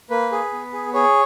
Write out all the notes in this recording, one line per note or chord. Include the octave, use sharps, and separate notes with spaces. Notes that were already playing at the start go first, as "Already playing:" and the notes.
A#3 B4
G#4
B3
G#4
G#4 C#5